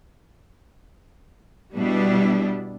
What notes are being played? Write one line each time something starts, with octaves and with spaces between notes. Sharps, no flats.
B2 G3 B3 D4 E4